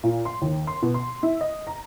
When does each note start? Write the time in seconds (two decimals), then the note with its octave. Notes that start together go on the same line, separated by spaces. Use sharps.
0.03 A#2
0.25 C6
0.42 D#2
0.67 C6
0.82 B2
0.94 C6
1.23 E4
1.41 D#5
1.67 A#5